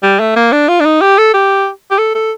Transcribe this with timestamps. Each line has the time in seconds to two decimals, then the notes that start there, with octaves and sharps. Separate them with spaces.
0.03 G3
0.20 A3
0.36 A#3
0.53 D4
0.69 F4
0.80 D4
0.86 D#4
1.01 G4
1.18 A4
1.34 G4
1.91 G4
1.99 A4
2.15 A4